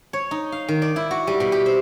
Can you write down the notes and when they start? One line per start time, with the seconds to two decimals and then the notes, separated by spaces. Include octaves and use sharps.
0.13 C#5
0.31 D#4
0.52 F5
0.68 D#3
0.82 D5
0.96 E4
1.11 F#4
1.27 G3
1.40 B2
1.52 G4
1.66 C5